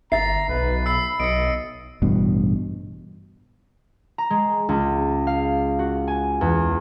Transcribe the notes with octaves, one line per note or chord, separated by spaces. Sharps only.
G1 E5 A#5 A6 C7
B1 B4
B5 E6 C7
B1 D#5 C#7 D7
A1 G2 B2
A#5
G#3
C#2
F5
F#4
G#5
E2